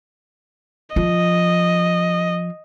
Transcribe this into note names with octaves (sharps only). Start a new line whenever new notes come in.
F3 D#5